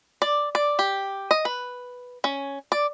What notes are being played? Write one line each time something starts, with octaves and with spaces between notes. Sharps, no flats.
D5
D5
G4
D#5
B4
C#4
D5